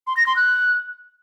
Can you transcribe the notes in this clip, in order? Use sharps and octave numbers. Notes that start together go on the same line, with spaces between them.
C6
A#6
C6
F#6